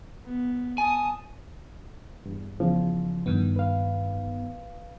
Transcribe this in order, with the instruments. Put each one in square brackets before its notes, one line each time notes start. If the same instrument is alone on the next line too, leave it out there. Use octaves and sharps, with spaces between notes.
[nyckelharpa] B3
[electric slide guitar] G#5 [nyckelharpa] A5 D#6
[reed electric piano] E2 G2
E2 C#3 F3
[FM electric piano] G2 D#3 B3
[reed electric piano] B4 F5